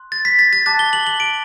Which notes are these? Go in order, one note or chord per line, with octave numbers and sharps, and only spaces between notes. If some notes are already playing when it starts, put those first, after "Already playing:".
Already playing: C6 F#6
A6
B6
A6
A6
A5 D6 F#6 A6
G7
F#7
F#7
D7